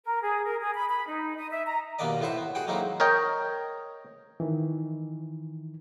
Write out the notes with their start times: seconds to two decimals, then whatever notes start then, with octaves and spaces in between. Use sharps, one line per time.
0.05 A#4
0.23 G#4
0.44 A#4
0.61 G#4
0.75 B5
0.88 B5
1.07 D#4
1.37 D#5
1.52 E5
1.66 A#5
1.99 D#2 B2 A#3 B3 D5 D#5
2.21 A2 B3 E4 C5 C#6
2.38 B3
2.55 F#4 G#4 F#5 G5
2.67 F#3 G#3 A#3 C4 D#4 E4
3.00 A#4 C#5 D#5 G5
4.40 D#3 E3